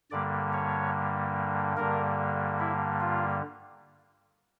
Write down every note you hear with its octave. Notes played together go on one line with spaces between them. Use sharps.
G2 D3 G3 A#3 D5
C#5
G2 D3 G3 A#3 A#4
E4
F4